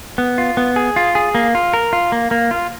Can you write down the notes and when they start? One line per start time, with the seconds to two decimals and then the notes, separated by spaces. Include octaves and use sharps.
0.18 B3
0.38 F4
0.57 B3
0.76 G#4
0.96 F4
1.15 G#4
1.35 A#3
1.55 F4
1.74 A#4
1.93 F4
2.12 A#3
2.31 A#3
2.51 F4